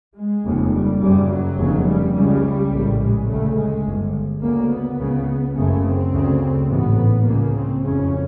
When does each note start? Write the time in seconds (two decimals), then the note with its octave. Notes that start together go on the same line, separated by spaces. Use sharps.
0.15 G#3
0.43 F1 D#2 C#3
0.72 G3
1.00 F#1 F#2 C#3 G3
1.29 F#3
1.57 F1 D#2 C#3
1.86 G3
2.14 C#2 C#3 G3
2.71 A#1 A2
3.00 G#3
3.28 D2 C#3 A3
3.56 G#3
3.85 G1 G2
4.42 D2 C#3 A#3
4.71 B3
4.99 C#2 C#3
5.56 F#1 F#2 C#3 A3
5.84 C4
6.13 D2 C#3
6.69 A1 G#2 B3
7.26 C#2 C#3 A#3
7.55 C4
7.83 F#1 F2 C#3 C#4